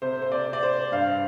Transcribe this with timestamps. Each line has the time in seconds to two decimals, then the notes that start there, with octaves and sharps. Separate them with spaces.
0.02 C3 C5
0.22 C5
0.32 D5
0.48 C4
0.53 D5
0.63 C5
0.92 G2 F5